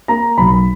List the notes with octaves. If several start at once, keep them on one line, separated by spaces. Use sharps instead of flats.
A#3 A#5
B1 B5